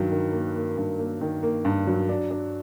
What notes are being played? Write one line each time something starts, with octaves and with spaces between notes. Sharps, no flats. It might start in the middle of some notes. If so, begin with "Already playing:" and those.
Already playing: G2 D#3 F#3
D#3
A#3
A#3
G2
A#3
D#3
A#3
G2
F#3
D4
D4